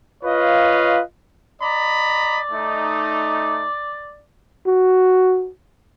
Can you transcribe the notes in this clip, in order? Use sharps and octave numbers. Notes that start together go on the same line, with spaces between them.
F4 B4 C#5 D#5 F5
D5 D#5 A#5 B5
A3 D#4
F#4